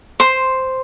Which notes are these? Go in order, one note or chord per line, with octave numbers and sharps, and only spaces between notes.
C5 C6